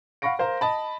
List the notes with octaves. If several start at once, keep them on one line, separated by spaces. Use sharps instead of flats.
F5 F#5 B5 C#6 A#6 D7
A#4 C5 F5 A#5
D#5 A5 B5